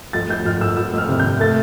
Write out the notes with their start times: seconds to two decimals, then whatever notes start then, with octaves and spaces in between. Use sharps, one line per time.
0.13 F2 A6
0.29 F2 G6
0.45 F2 F6
0.61 F2 E6
0.77 F2 E6
0.93 F2 F6
1.09 C3
1.20 G6
1.25 C3
1.40 A3 A6